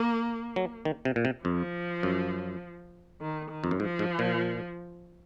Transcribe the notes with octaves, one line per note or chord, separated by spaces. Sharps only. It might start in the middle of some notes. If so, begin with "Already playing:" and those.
Already playing: A#3
F#3
D#3
C3
A#2
C3
F2 F3
F#2
D#3
D#3
F2
F#2
G#2 F3
G#2
A#2